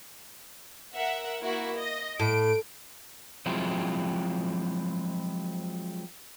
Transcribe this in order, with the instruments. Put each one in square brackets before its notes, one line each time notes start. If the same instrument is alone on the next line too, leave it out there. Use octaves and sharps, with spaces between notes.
[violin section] A#4 E5 F#5
A#3 E4 F#4
D#5
[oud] A2 [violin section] D7
[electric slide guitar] F3 F#3 G#3 C4 E4